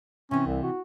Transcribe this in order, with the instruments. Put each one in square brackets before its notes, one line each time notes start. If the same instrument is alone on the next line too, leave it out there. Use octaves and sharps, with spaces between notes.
[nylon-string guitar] C3 E3 [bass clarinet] C#4
[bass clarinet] C2
F#4